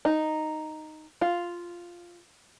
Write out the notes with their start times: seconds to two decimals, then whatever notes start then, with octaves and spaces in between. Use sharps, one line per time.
0.05 D#4
1.21 F4